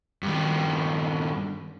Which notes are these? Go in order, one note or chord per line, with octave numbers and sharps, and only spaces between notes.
G2 D#3